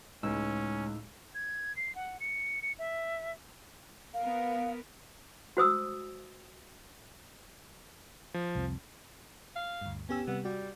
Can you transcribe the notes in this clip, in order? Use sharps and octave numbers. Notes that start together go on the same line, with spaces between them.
C#2 A2 G#3 C#4 D#4 E6
G#6
C7
F#5
C#7
C#7
E5
B3 A#4 F5
F#4 C5 D#6 E6
F3
C2 F2
F5
D2 G2
B3 C#4 G4 E6
C3 G3 B3
G3 F#4